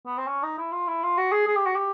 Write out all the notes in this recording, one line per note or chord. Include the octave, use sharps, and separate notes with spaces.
B3
C4
C#4
D#4
E4
F4
E4
F4
F#4
G#4
G#4
G4
F#4
G4